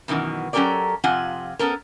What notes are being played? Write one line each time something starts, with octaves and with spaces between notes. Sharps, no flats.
F#2 B2 D#3 E3 F#4
F#3 C#4 G4 A4 A#4 D5
F2 C3 F4 F#5 G#5
B3 C#4 A4 A#4